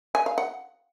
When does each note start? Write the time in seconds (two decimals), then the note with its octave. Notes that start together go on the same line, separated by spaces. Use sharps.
0.15 G#5
0.26 F5
0.38 F#5